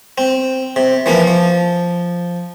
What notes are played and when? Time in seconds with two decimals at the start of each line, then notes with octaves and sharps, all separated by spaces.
0.18 C4
0.76 C3
1.06 E3 F3 A#3
1.27 F3